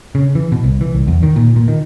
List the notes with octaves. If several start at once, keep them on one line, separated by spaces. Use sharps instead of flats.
C#3
E3
B2
C2
E3
C2
E2
D#3
A#2
A#2
D#3